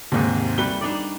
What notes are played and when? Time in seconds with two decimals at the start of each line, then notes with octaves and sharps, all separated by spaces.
0.12 D#2 G#2 C3 D#4
0.58 G3 A3 B4 G7
0.81 D4 D#4 D5